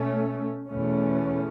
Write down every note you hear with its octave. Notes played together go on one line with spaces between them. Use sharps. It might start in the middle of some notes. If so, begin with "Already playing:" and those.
Already playing: B2 A3 C#4
E2 B2 A3 C#4